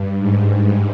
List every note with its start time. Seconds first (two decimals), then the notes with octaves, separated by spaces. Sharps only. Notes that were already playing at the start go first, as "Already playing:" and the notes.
Already playing: G2
0.17 G#2